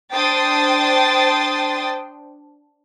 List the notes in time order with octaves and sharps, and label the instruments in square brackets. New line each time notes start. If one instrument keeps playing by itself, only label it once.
[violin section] D4 C5 G5 C6 D#6 A6